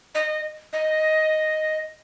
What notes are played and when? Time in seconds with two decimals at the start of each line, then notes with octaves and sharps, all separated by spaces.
0.15 D#5
0.73 D#5